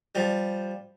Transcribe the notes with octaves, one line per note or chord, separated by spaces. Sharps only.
F3 G3